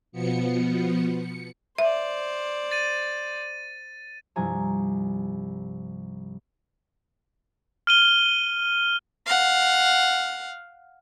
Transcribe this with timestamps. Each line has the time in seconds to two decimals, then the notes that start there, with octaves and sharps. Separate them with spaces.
0.12 B2 F3 B3 C#7
1.18 C#7
1.78 C5 D5 E5
2.71 A6 D#7
4.36 C2 G2 C3 F3 G#5 A#5
7.87 F6 D#7 G7
9.26 F5 F#5